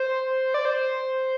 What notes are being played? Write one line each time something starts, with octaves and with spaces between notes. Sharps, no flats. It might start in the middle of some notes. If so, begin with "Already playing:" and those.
Already playing: C5
D5
C5